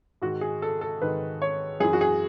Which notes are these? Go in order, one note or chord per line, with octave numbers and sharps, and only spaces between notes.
G#2 D#3 F#4
G#4
A4
A4
G#2 D#3 B4
C#5
F#2 E3 G#4
F#4
G#4